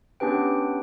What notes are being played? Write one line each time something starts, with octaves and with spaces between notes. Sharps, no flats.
B3 C#4 D4 G4 B4 G5